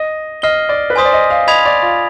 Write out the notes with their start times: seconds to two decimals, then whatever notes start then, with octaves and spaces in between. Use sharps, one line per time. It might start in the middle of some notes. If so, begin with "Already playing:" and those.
Already playing: D#5
0.42 D#5 F6 C7 G7
0.69 D5
0.90 B4
0.96 C5 G#5 C6 D#6 B6
1.05 D5
1.13 D#5
1.31 F5
1.47 D#5 B5 D#6 G#6 B6 F7
1.65 D5
1.82 F4